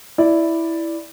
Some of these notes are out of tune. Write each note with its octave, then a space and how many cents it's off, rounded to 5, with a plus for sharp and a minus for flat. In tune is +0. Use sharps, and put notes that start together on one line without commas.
E4 +0 D5 +0